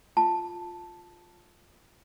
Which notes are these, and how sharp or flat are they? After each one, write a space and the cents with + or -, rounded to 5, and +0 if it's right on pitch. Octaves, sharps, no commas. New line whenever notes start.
F4 +5 A5 +0